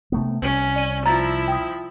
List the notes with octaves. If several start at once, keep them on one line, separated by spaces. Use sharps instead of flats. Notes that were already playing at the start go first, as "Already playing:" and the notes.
C3 A3 B3
C2 C#4
D5 D#7
F3 E4 A#5 A6
G5 D#6